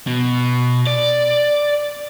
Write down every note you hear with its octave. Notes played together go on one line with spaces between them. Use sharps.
B2
D5